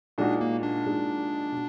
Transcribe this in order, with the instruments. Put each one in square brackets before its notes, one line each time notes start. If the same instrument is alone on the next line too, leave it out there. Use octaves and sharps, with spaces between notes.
[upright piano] A#2 G#3 D#4 F#4 [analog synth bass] D4
[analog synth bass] A#3
D4
[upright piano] A#2 G#3 D#4 F#4
B2